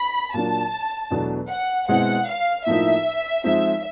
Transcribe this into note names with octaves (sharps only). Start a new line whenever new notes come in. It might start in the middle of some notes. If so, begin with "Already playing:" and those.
Already playing: B5
A#2 F#3 A#3 D4 A5
E2 B2 F#3 A3 D4
F#5
B2 G#3 C4 E4 F#5
F5
A2 F3 A#3 D#4 E5
F3 G#3 C4 D#4 E5